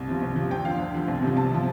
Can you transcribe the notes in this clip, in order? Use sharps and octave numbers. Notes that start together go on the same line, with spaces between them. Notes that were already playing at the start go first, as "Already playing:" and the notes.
Already playing: C2
C3 F3
C2
C3 F3
D2 G5
D3 F3 F5
D2
D3 F3
C2
C3 F3
C2 A5
C3 F3